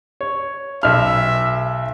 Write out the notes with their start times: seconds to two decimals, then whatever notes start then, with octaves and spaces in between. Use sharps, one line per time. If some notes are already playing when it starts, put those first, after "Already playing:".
0.21 C#5
0.83 B1 E5 F6